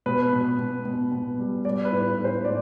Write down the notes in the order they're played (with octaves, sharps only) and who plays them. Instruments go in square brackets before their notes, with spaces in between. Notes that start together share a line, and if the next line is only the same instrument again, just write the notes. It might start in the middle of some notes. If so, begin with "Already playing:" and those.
[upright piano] B2 B4
B2
B2
B2
B2
G3
G3 D5
B4
A2
B4
A2
C5
A2 D5